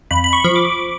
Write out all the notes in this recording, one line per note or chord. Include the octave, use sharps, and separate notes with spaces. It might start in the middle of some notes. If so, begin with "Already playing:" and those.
F2 B5
B5
C#6
F3
D6